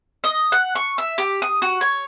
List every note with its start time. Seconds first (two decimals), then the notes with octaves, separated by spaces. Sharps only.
0.24 D#5
0.52 F#5
0.75 C#6
0.98 E5
1.18 G4
1.42 D#6
1.62 F#4
1.81 C#5